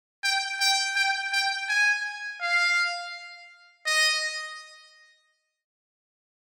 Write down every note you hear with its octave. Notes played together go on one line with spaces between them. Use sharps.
G5
G5
G5
G5
G#5
F5
D#5